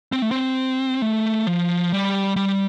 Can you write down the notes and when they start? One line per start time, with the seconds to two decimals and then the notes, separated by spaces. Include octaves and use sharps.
0.12 C4
0.22 A3
0.31 C4
1.02 A3
1.47 F3
1.92 G3
2.36 G3